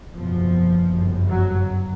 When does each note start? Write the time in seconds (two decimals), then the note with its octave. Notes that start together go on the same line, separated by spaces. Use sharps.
0.14 F#1 E2 B2 F3
0.90 G1 F#2 C#3
1.27 F#3